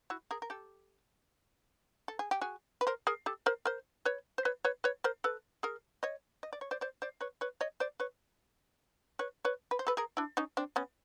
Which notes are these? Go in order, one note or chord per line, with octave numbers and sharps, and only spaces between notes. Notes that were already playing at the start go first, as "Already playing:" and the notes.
E4 F#4
G#4 A#4
A#4
G4 A4
A4
G#4
G4
F#4 G#4
B4
A#4 C5
G#4 A#4
G4 A4
A#4 C5
A#4 C5
B4 C#5
C5
B4 C#5
B4 C#5
B4 C#5
A#4 C5
A4 B4
G#4 A#4
C#5 D#5
D#5
D5
C#5
C5 D5
C5 D5
C5 D5
B4 C#5
B4 C#5
C#5 D#5
C5 D5
B4 C#5
B4 C#5
B4 C#5
B4
C5
A4 B4
G#4 A#4
D4 E4
C#4 D#4
C4 D4
B3 C#4